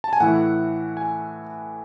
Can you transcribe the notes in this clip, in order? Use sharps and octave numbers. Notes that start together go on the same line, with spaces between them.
A5
G#5
A2 E3 A3 E4 F#5
G#5